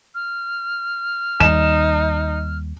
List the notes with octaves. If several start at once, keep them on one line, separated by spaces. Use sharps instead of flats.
F6
D#2 G3 D#4 E7